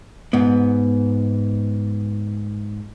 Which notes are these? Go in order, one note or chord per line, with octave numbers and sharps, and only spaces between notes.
G#2 B3